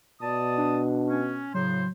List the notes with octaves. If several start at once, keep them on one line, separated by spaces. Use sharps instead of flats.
B2 D5 A5 D#6
D4
C#4
A2 C#3 F#3 C5